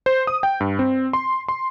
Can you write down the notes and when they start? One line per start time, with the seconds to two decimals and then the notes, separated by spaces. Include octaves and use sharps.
0.06 C5
0.27 D#6
0.43 G5
0.60 G2
0.79 C4
1.13 C6
1.48 C6